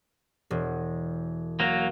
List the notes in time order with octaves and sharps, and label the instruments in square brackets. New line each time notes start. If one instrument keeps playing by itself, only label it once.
[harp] E1
[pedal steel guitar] F#3 A#3